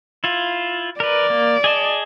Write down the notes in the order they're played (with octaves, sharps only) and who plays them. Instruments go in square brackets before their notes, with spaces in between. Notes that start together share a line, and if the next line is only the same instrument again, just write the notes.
[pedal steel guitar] E4 F4
[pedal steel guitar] A#4 B4 [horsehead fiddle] D5
[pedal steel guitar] A#3
G#4 D#5 A5